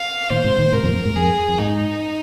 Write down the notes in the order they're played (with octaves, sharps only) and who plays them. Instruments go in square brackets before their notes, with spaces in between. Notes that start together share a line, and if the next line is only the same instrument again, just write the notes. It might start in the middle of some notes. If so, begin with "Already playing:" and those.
Already playing: [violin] F5
[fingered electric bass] A#2 D#3 [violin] C5
[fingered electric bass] G#2 C3
A#2 D#3
[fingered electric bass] G#2 C3 [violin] A#4
[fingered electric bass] F2 A#2
F2
G#2
[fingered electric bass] F2 [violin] G#4
[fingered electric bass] F2
[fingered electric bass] G#2 [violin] D#4